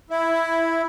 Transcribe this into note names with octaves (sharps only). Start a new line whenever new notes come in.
E4